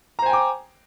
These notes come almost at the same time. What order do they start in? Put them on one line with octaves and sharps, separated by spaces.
A#5 C5 G#5 G5 D6